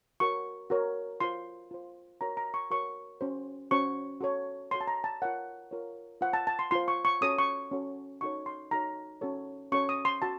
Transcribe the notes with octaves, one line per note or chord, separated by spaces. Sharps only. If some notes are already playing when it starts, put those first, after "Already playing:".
F#4 A#4 C#5 C#6
F#4 A#4 C#5
F4 C5 C6
F4 C5
F#4 A#4 C#5 A#5
A#5
C#6
F#4 A#4 C#5 C#6
C#4 F#4 C5
C#4 F#4 C5 C#6
F#4 A4 C#5
F#4 A4 C#5 C6
A5
A#5
A5
F4 A#4 C#5 F#5
F4 A#4 C#5
F4 C5 F#5
A5
A5
C6
F4 C5 C6
C#6
C#6
C#4 F#4 A4 C#5 D#6
C#6
C#4 F#4 A4 C#5
D#4 F#4 A4 C#5 C#6
C6
D#4 F#4 A4 C#5 A#5
C#4 F#4 A4 C#5
C#4 F#4 A4 C#5 C#6
D#6
C6
F#4 A5